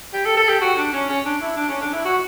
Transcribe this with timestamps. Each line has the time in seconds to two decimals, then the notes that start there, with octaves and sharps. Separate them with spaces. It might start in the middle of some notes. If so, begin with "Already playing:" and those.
0.13 G4
0.25 A4
0.37 A4
0.49 G4
0.61 F#4
0.77 D4
0.93 C#4
1.09 C#4
1.25 D4
1.41 E4
1.56 D4
1.69 C#4
1.81 D4
1.93 E4
2.05 F#4